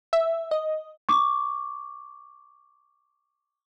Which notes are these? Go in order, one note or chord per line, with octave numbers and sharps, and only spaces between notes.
E5
D#5
C#6 D6